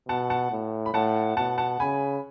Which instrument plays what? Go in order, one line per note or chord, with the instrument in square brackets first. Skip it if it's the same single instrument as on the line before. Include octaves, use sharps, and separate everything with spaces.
[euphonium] B2 [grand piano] F#5 A5
[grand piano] F#5 A5
[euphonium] A2
[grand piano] B5
[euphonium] A2 [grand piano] F#5 A5
[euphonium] B2 [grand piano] F#5 A5
[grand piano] F#5 A5
[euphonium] C#3 [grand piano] G#5 B5